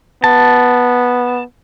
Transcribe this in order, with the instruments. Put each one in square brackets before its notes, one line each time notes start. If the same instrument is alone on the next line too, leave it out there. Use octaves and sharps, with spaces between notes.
[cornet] B3 [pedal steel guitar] A5